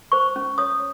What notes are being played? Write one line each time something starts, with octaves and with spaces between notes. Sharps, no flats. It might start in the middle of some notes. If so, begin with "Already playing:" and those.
C5 C#6
C#4
C#5 D#6